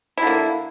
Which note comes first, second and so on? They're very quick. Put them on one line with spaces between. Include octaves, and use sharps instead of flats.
E4 D3 A#3